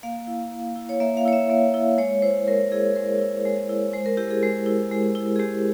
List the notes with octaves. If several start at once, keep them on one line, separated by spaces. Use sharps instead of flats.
A#3 F5
E4
A#3
E4
C#5
A#3 E5
F5
E4 C#5
E5
A#3
E4
G#3 C#5
E4 C5
G#3 A#4
E4 G#4
G#3 A#4
E4
G#3
E4
G#3 C5
A#4
E4 G4
G#4
G#3
E4
G#3
E4
G#4
G#3 G4